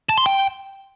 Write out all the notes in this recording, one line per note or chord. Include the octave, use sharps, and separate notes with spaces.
A5
C6
G5